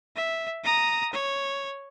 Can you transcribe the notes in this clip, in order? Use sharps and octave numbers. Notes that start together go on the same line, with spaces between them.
E5
A#5 D#6
C#5